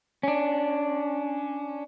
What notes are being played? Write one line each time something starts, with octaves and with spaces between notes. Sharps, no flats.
C#4 D4